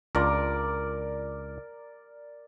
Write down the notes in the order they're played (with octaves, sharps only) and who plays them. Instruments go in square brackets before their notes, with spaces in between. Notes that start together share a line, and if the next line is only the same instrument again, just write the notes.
[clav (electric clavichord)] C#2 D4 F4 [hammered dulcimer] A#4 D5